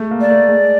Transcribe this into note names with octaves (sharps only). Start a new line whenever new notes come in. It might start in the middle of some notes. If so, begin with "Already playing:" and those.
Already playing: G#3 A3
A#3
D5
A3
G#3